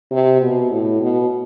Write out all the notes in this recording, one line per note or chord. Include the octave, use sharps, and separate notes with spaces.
C3
B2
A2
B2